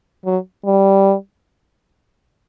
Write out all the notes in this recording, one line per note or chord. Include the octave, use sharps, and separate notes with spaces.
F#3
G3